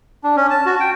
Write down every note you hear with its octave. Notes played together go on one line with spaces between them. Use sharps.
D4
C#4
A5
F#4
G5